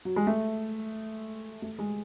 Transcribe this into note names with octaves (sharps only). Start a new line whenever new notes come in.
F#3
G#3
A3
A3
G#3